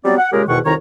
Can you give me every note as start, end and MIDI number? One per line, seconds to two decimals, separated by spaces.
0.05 0.15 54
0.05 0.15 55
0.05 0.15 59
0.05 0.15 60
0.05 0.15 74
0.18 0.28 78
0.32 0.43 46
0.32 0.43 49
0.32 0.43 56
0.32 0.43 67
0.32 0.43 68
0.32 0.43 70
0.48 0.59 40
0.48 0.59 44
0.48 0.59 47
0.48 0.59 51
0.48 0.59 78
0.48 0.59 85
0.65 0.73 36
0.65 0.73 41
0.65 0.73 51
0.65 0.73 63
0.65 0.73 73
0.65 0.73 82